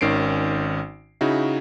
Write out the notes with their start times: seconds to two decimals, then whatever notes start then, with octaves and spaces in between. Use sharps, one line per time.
0.01 G#1 D#3 C#4 C7 D7
1.21 C#3 D#4 E4 F#4